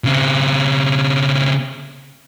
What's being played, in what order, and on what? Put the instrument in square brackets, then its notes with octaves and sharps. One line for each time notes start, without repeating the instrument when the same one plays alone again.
[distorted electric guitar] C#3 C4